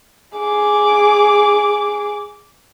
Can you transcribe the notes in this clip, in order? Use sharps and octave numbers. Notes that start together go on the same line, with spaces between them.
G#4 D6